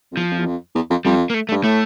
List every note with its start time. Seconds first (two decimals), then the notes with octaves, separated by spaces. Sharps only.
0.12 F2
0.17 E2 F3
0.31 F2
0.39 E2
0.47 F2
0.75 E2
0.90 F2
1.05 F2 G3
1.30 A#3
1.34 A3
1.49 A3
1.51 G2
1.63 A2 A3